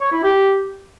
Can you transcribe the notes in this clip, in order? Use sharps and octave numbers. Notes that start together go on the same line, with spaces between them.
C#5
E4
G4